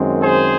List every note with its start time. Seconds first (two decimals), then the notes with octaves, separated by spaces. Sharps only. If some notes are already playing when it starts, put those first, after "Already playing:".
Already playing: F#2 D#3 G#3 C4
0.22 G#4 C5